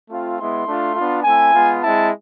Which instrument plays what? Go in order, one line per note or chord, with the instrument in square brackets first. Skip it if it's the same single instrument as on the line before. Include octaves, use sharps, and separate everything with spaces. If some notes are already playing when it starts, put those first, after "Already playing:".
[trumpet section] A3 C4 F4
G#3 B3 E4 C6
A3 D4 F4
B3 D4 F4
A3 C4 E4 G#5
G#3 B3 F4
G#3 C4 E4 A5